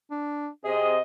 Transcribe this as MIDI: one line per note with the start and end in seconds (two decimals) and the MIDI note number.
0.11 0.49 62
0.64 0.99 48
0.64 0.99 60
0.64 0.95 68
0.64 0.99 75